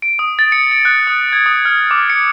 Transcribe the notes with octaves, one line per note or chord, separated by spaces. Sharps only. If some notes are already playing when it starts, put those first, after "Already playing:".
D7
D#6
A6
C#7
D7
F#6
D#6
G#6
D#6
F6
D6
C#7